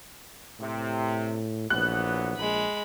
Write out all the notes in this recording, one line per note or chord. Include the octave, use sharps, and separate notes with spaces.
A2 C3
A#1 E3 F#3 B3 F#6
A#1 G#3 B5